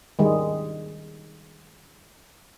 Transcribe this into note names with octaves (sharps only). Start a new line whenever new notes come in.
D#3 G3 G#3